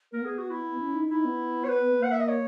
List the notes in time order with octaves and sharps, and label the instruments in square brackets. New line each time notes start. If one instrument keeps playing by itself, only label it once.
[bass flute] A#3 [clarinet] A#4
[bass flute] B3 [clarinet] G#4
[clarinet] F#4
E4
[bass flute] C#4
D#4
[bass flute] D#4 [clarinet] E4
[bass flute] B3
[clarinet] C#5
B4
[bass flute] A#3
[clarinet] F#5
E5
D#5
C#5